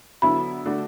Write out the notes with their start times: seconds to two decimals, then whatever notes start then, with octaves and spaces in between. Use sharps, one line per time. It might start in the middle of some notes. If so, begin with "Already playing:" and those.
0.22 D3 F#3 B3 E4 B5
0.65 D3 A3 D4 F#4